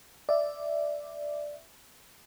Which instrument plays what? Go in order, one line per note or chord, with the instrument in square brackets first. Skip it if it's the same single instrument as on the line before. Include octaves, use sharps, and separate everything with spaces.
[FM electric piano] D5 E5